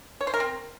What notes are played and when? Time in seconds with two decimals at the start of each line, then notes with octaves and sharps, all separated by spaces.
0.21 C#5
0.27 C5
0.34 A#4
0.40 C4